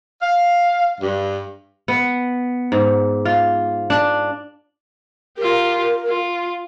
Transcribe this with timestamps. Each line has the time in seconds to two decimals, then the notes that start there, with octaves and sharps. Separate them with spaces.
0.22 F5
1.00 G2
1.88 B3
2.72 G#2
3.25 F4
3.90 D4
5.37 F4 G4 A#4
6.08 F4